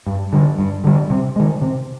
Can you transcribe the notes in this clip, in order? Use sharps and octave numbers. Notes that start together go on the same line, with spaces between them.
G2
D3 G3
G2
D3 G3
C3
D#3 G#3
C3